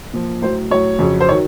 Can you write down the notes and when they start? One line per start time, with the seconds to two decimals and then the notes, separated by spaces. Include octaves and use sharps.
0.13 A#2 F3
0.42 A2 F#3 C5
0.70 A2 F#3 C#5
0.99 F2 C#3 F#3
1.20 C5
1.29 D#3 F#3 C#5